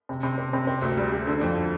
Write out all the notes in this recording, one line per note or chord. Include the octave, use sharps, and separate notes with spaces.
C3
C3
C4
C3
C4
D2
G3
G3
D3
F2